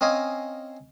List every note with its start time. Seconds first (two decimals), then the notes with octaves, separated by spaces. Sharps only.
0.01 C4 C#4 D#5 F5 G#5